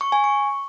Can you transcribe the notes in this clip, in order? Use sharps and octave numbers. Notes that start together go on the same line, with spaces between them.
C#6
G#5
C#6